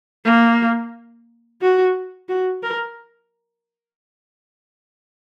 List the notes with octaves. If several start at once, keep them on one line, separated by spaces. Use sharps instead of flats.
A#3
F#4
F#4
A#4